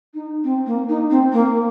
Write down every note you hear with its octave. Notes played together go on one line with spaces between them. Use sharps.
D#4
C4
A#3
D#4
C4
A#3